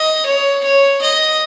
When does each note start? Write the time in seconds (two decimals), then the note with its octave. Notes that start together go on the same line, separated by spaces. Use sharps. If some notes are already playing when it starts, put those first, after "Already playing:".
Already playing: D#5
0.26 C#5
0.64 C#5
1.01 D#5